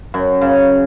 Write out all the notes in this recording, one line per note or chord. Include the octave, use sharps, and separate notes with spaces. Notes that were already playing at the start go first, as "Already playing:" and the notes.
F#2
C#3